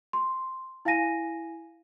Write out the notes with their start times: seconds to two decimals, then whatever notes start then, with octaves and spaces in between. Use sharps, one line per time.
0.13 C6
0.85 E4 F5 G#5 A#6 D#7